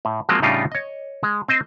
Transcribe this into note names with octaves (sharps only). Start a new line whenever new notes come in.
A2
F3 F#3 G#3 A#3 C4
A2 C#3 G3 D4 D#4 F4
C#5 D#5
G#3
C4 C5 D#5